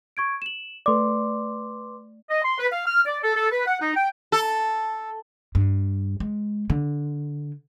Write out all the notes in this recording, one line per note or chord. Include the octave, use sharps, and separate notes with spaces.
C#6 G#6 D7
E7 F#7
A3 B4 D5 C6 D6
D#5
C6
B4
F5
F6
D5
A4
A4
B4
F#5
D#4
G5
A4
G2
G#3
D3